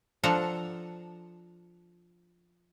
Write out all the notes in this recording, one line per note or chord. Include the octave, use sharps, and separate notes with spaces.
F3 D4 A4 F#5 A#5